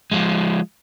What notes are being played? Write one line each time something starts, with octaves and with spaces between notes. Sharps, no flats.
F3 G#3